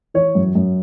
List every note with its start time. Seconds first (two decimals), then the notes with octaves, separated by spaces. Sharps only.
0.14 E3 C#5
0.35 F#2
0.55 F#2